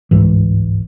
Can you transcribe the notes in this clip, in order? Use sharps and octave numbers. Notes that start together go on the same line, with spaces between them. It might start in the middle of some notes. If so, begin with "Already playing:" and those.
G1 C#2 G#2 E3